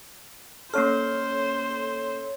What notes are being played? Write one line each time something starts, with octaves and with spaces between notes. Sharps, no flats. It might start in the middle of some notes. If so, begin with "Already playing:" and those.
A#3 C#4 A4 C5 C#5 F6